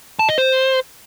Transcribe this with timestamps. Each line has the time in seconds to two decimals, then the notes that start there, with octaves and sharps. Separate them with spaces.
0.19 A5
0.29 D#5
0.38 C5